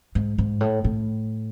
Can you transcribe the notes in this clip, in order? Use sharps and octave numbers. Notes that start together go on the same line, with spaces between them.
G#2
G#2
A2
A2